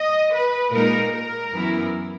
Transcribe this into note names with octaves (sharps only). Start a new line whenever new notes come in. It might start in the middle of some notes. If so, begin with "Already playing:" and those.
Already playing: D#5
B4
A#2 G#3 D#4 A#4
A#4
F#2 E3 B3 E4